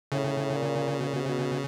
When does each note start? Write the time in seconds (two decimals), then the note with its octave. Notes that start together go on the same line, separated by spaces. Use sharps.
0.12 A2 C#3
0.55 A#2
0.99 B2
1.07 A#2
1.15 B2
1.23 C3
1.28 B2